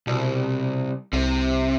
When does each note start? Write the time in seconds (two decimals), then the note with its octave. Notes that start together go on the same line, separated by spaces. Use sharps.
0.07 C2 B2
1.13 C2 C3